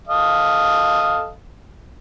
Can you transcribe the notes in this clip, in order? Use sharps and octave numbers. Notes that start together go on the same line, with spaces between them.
A4 D#5 F5